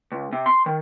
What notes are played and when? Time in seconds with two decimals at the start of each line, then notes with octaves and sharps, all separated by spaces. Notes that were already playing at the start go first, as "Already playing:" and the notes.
0.12 C#2
0.33 C3
0.46 C6
0.66 D#3